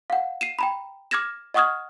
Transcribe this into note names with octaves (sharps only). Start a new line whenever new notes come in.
F5 F#5
C7 D#7 E7
G5 A#5 B5
D6 F6 G#6 A#6 E7
D#5 F#5 C#6 D#6 F6 G#6